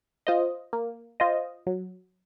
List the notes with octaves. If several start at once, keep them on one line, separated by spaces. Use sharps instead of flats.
F4 C5 D#5
A#3
F4 C5 D#5
F#3